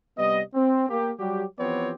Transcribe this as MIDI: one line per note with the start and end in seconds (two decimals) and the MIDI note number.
0.18 0.42 48
0.18 0.42 55
0.18 0.42 59
0.18 0.42 75
0.54 0.87 60
0.90 1.12 58
0.90 1.12 67
1.19 1.44 54
1.19 1.44 55
1.19 1.44 66
1.19 1.44 67
1.59 1.93 52
1.59 1.93 53
1.59 1.93 59
1.59 1.93 60
1.59 1.93 67
1.59 1.93 73